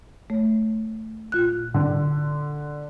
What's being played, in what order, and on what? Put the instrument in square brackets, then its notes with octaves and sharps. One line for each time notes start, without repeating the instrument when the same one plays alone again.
[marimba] A3 C#5
A#2 F4 F#6
[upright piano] D3